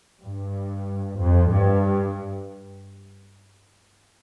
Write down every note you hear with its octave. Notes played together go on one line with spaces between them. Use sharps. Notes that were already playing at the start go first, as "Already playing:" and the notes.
G2
F2
G2